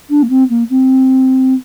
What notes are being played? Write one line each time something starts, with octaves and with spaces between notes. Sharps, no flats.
D4
A#3
C4
A#3
C4